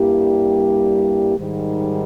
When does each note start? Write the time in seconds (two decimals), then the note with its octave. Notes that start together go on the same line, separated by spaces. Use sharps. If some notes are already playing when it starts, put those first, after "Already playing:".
Already playing: G2 G3 A#3 E4 G4
1.37 G#2 D#3 G3